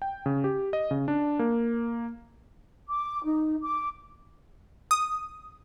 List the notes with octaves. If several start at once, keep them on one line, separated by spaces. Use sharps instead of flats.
G5
C#3
G4
D#5
C#3
D4
A#3
D6
D#4
D6
D#6